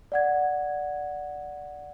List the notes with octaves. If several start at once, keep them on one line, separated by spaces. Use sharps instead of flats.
D5 F#5 G#6